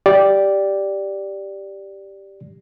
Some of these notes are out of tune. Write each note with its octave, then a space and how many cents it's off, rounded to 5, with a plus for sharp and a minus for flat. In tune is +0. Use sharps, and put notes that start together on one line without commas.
G4 +0 D5 +0